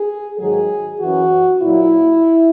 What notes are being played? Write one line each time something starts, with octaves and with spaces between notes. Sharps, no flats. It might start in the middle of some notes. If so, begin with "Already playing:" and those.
Already playing: G#4
G#2 D#3 F#3 G#4
F#2 E3 F#4
A#2 F#3 E4